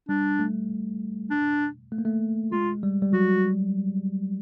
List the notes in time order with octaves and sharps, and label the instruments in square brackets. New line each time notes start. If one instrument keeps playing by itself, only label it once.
[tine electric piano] G3 [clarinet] D4
[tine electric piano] A3
[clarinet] D4
[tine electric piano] A3
A#3
A3
[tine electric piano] G#3 [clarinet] F4
[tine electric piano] G3
G3
[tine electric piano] F#3 [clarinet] F#4